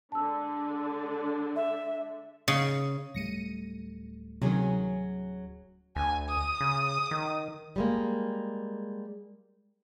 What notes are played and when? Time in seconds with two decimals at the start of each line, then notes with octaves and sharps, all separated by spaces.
0.12 D3 G#3 D4 A5 E6
1.56 E5
2.48 C#3
3.14 D1 G3 A3 A#6 C#7 D#7
4.42 C3 D#3 F#3 C#4 G#4
5.96 D2 G#5
6.28 D#6
6.61 C#3
7.11 D#3
7.76 G3 G#3 A#3